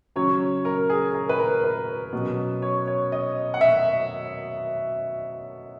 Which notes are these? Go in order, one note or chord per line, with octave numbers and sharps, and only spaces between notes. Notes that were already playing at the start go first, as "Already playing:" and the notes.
C#3 F#3 C#4 C#5
A#4
G#4
A#4
B4
A#4
B4
B2 F#3 C#4
C#5
C#5
D#5
F#5
E5